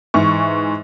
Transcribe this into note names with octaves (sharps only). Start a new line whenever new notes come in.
G#2 E3 C#6